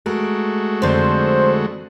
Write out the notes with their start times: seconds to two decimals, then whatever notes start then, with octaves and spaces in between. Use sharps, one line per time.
0.06 G#3 A3 F#4 A#4
0.82 F2 D3 C5